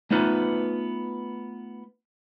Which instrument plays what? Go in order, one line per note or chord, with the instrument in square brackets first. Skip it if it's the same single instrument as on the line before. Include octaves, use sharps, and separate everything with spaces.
[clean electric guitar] A3 B3 D#4 F4 B4